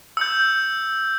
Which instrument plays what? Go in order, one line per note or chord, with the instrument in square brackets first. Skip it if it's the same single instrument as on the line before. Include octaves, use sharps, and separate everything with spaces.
[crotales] E6 G6